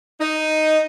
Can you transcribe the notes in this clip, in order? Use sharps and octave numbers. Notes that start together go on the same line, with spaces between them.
D#4